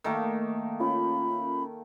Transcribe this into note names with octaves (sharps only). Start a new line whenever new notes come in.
D#3 A3 A#3
C#4 F4 B5